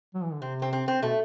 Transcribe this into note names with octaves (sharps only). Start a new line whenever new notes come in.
F#3
E3
D3
C3 C4
C4
C4
C4
B2 A3